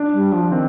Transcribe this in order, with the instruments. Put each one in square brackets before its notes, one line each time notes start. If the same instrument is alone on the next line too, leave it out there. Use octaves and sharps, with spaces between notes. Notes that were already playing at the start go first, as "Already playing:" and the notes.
Already playing: [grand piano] D4
[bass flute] G3
F3
[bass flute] D#3 [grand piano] C4